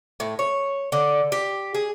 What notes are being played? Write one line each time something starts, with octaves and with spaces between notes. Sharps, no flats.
A2
C#5
D3
G4
G#4